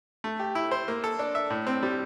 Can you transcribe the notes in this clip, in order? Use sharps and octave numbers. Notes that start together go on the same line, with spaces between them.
A3
G4
E4
C5
A#3
A4
D4
E5
A2
C4
G3